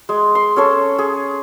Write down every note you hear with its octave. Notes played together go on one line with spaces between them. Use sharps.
G#3
C6
C#4 A4 C#5 A5
G#4